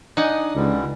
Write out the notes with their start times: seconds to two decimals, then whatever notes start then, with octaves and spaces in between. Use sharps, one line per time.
0.17 D4 D#4 F#5 G#5 D#6
0.55 C#2 D3 E3 G3